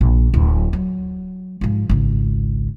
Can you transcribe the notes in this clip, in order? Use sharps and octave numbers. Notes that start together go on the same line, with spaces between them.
A#1
D1
F#3
G#2 F3
G#1 C#2